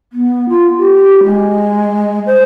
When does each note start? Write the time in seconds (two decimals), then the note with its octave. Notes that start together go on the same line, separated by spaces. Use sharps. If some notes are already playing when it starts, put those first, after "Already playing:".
0.13 B3
0.49 F4
0.78 G4
1.24 G#3
2.26 C5